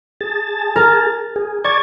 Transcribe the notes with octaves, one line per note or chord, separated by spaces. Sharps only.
G#4 A5
A#4
G#4
D5 A5 C#6 G#6